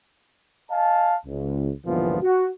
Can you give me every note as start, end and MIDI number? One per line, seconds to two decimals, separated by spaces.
0.71 1.15 75
0.71 1.15 77
0.71 1.15 80
0.71 1.15 81
1.26 1.71 37
1.86 2.18 31
1.86 2.18 37
1.86 2.18 46
1.86 2.18 52
1.86 2.18 53
1.86 2.18 59
2.23 2.48 66